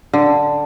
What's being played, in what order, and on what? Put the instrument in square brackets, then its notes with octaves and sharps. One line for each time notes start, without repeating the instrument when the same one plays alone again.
[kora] D3